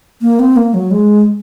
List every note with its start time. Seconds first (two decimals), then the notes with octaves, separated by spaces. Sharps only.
0.22 A#3
0.39 C4
0.56 A#3
0.74 F#3
0.91 G#3